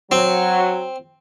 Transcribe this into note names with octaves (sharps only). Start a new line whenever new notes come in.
F#3 C4